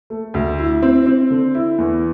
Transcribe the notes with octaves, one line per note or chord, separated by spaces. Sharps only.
A3
D2
E4
C4
C4
D3
E4
E2